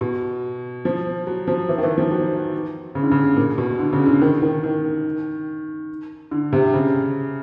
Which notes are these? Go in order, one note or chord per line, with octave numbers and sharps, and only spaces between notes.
B2
F3
F#3
F3
E3
D#3
E3
F3
F#3
C#3
D3
C#3
A#2
B2
D3
C#3
D3
D#3
D#3
D#3
D3
C3
C#3